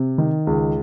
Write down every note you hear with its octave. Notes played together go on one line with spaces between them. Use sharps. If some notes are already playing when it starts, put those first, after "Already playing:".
Already playing: C3
D#3
C#2